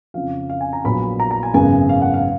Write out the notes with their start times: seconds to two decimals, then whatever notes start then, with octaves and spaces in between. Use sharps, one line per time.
0.14 F2 C#3 F3 F5
0.50 F5
0.61 G#5
0.73 A#5
0.84 A#1 A#2 F#3 B3 B5
1.20 A#5
1.31 A#5
1.43 G#5
1.54 G#1 F#2 C#3 G#3 B3 G#5
1.89 F5
2.02 F#5
2.14 F5